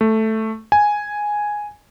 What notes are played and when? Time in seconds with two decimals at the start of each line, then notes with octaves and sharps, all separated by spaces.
0.01 A3
0.72 G#5